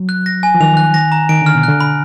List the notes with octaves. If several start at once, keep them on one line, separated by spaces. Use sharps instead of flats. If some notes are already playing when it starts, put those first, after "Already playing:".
Already playing: F#3
F#6
A#6
G#5
F3
D#3 F7
F#6
A#6
A#5
D#3 D7
D3 F6
B2
F#6
D3
B5